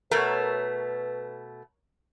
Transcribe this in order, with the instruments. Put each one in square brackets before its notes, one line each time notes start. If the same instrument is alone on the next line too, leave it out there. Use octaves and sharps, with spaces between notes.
[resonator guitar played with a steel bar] B2 A3 [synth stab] A#4 C#5 [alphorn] B4